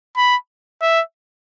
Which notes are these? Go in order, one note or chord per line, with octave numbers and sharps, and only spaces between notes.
B5
E5